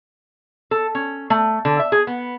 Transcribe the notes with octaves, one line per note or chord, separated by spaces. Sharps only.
A4
C#4
A3
D3
E5
G#4
B3